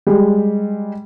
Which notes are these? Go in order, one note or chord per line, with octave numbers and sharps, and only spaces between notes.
G3 G#3